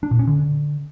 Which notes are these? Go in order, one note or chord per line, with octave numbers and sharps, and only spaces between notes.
D4
A#2
C#4
D3